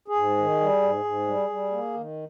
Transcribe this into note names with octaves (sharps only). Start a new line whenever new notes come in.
G#4
G#2
D#3
G3
G#2
G#2
G3
G3
A#3
D#3